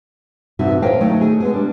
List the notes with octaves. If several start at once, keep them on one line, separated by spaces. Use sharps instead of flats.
E2 G2 C3 D#4 F#4 E5
A#4 C5 C#5 D#5 F5 G5
D#3 F#3 A3 C#4 D#4
G#4
G#3 B3 G#4
G3 D4